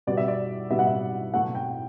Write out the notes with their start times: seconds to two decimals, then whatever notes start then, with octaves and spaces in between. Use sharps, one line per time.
0.07 B2 G3 B3 D5
0.17 E5
0.28 D5
0.70 B2 G3 B3 E5
0.79 F#5
0.87 E5
1.34 B2 F#3 A3 F#5
1.55 G5